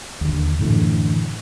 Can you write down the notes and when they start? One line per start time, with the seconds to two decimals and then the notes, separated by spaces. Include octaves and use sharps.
0.21 D#2 D3
0.59 F#2 A2 D3 E3